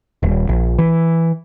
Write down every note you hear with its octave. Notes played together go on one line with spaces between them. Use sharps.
D#1
A#1
E3